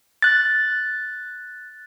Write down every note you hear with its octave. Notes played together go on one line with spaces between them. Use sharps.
F#6 A6